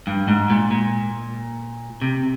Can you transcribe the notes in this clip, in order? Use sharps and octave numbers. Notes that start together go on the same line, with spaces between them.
G2
G#2
A#2
A#2
C3